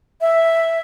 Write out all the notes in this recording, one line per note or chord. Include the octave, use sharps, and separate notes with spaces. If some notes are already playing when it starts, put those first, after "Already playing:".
E5